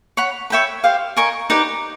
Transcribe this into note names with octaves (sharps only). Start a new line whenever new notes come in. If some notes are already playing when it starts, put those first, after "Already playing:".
C#5 F#5 B5
C#5 E5 G5 B5
G4 C5 F5
A#4 D#5 G#5 C#6
D#4 G4 B4 D5